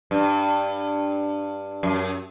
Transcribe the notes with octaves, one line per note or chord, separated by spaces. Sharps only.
G2
F#2